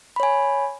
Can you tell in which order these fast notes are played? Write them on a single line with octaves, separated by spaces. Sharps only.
B5 C#5 G#5